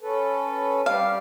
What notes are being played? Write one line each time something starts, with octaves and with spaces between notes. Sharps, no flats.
C#4 A4 B4
G3 G4 D5 F5